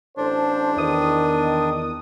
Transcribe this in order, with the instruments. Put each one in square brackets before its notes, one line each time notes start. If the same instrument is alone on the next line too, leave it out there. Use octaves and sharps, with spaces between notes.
[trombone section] A1 A4 C5 [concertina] D4
[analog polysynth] E2 D#6 [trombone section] D#3